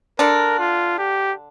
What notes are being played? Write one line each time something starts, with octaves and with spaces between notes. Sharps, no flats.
D3 D4 A#4
F4
G4